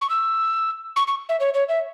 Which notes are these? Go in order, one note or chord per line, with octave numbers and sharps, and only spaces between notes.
C#6
E6
C#6
C#6
E5
C#5
C#5
E5